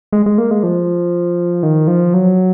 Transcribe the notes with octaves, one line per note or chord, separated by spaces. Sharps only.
G#3
G#3
A#3
G#3
F3
D#3
F3
F#3